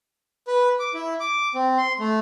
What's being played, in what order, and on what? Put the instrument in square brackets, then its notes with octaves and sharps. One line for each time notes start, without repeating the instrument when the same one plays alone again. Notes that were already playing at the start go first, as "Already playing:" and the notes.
[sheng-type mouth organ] B4
D6
E4
D6
C4
C6
A3